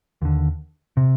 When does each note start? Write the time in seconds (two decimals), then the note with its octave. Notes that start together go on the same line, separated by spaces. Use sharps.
0.22 D#2 D3
0.97 C3